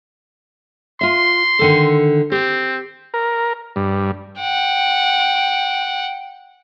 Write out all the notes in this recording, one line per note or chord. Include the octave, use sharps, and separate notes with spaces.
F4 E5 C6
D3 D#3 A4
C4 G4
A#4
G2
F#5 G5